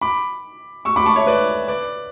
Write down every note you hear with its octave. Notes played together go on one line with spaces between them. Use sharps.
B5 D6
C#6 E6
B5 D6
A5 C#6
C#5 E5
B4 D5
B4 D5